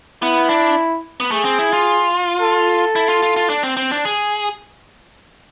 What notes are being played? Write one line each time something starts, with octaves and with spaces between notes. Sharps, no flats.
B3 E4
D4
B3
A3 G#4
C4
E4
F4
A4
E4
F4
F4
F4
D4
C4
C4
D4
G#4